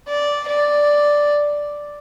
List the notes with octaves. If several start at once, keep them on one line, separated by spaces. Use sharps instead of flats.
D5
D5